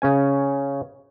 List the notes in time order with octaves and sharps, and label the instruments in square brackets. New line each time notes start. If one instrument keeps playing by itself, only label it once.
[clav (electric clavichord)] C#3 C#4 G#5